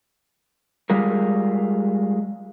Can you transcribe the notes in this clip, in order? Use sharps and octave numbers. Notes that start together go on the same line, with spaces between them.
G3 G#3 F4 A#4